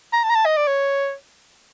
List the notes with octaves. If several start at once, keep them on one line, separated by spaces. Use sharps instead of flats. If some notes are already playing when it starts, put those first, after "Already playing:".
A#5
A5
A#5
A5
D#5
D5
C#5